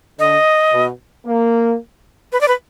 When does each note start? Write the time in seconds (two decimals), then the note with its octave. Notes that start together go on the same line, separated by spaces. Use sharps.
0.19 D3 D#5
0.72 B2
1.26 A#3
2.32 B4
2.41 D5
2.48 B4